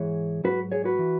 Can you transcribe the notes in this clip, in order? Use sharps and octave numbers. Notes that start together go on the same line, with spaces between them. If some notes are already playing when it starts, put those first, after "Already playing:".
Already playing: G#2 E3 G#4 C#5
G#2 F#3 F#4 B4
G#4 C#5
F#4 B4
E3